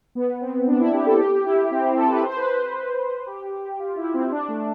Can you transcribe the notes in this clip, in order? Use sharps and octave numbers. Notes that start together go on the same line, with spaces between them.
B3
C4
D4
E4
G4
A4
G4
E4
C4
C4
A4
B4
C5
B4
C5
B4
G4
F4
E4
C4
D4
A3